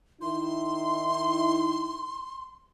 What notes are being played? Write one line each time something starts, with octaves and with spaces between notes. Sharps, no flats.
D#3 D#4 E4 C6